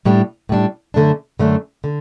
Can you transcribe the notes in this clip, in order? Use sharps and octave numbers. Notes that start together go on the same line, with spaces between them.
A2 G3 D4
A2 G3 D4
F#2 D3 A3 D4
F#2 D3 A3 D4
D3